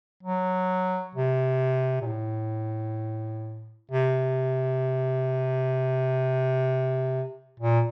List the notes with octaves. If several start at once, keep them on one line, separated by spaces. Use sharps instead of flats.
F#3
C3
A#2
A2
C3
A#2